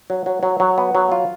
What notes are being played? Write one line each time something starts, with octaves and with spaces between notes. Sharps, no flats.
F#3
F#3
F#3
F#3
B3
F#3
F4